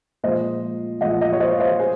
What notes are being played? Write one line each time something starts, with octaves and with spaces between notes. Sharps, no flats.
A#2 F3 G#3 C5 D#5
A#2 F3 G#3 D#5 F#5
D#5 F#5
C#5
C5 D#5
F5
C5 D#5
G#4 C5